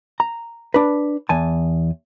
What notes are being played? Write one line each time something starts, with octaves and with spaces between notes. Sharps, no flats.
A#5
D4 B4
E2 G#5 A5